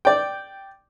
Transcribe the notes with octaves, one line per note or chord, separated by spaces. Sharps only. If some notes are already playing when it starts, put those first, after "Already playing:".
D5 G5